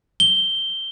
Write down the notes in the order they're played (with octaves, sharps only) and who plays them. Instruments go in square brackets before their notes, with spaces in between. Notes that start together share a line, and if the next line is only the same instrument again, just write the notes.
[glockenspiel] G7